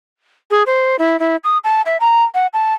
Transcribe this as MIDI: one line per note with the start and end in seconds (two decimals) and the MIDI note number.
0.51 0.63 68
0.66 0.96 72
0.99 1.19 64
1.20 1.36 64
1.44 1.58 87
1.64 1.82 81
1.86 1.97 76
2.00 2.24 82
2.35 2.47 78
2.53 2.74 81